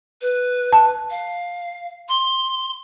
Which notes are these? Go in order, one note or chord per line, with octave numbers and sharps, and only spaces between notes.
B4
A5
F5
C6